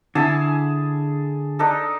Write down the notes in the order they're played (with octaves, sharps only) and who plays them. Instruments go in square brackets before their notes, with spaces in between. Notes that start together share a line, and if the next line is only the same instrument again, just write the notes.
[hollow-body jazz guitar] D3 E4 [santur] G#4 A5
[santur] D4 D#4 A4